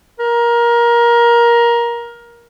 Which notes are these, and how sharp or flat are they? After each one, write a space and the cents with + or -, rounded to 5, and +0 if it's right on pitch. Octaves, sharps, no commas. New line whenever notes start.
A#4 +20